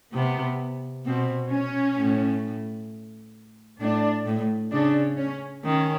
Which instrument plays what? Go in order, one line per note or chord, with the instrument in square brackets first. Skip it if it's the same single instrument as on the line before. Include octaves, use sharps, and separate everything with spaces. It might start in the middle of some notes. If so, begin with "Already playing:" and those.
[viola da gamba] C3 [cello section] B3
[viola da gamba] B2 [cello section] C4
[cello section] C#4
[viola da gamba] A2
[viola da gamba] A2 [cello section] D4
[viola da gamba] A2
[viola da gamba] C#3 [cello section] D4
[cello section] C#4
[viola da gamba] D#3 [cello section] C#4